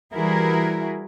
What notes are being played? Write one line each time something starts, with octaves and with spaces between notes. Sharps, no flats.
E3 G3 E4 F#4 G#4 A#4